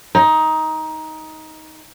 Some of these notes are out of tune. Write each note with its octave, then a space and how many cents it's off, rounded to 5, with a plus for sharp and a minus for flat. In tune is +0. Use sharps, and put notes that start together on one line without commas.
D#4 +15